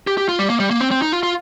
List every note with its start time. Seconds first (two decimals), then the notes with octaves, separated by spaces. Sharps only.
0.07 G4
0.18 G4
0.29 F4
0.39 G3
0.50 A#3
0.60 G3
0.70 A#3
0.81 C4
0.91 C4
1.02 D#4
1.12 F4
1.23 F4